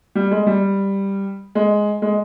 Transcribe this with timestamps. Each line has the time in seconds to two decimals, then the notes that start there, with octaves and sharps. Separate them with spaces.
0.16 G3
0.31 G#3
0.47 G3
1.55 G#3
2.02 G#3